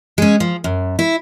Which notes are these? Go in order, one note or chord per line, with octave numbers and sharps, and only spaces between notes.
G#3 C#4
F3
F#2
E4